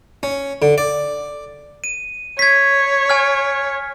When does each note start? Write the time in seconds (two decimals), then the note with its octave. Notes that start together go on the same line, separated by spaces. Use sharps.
0.23 C#4
0.62 D3
0.78 D5
1.84 D#7
2.39 C#5 G#6 B6
3.10 G#5 F6